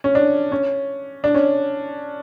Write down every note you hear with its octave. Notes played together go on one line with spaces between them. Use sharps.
C#4
D4
C#4
D4
C#4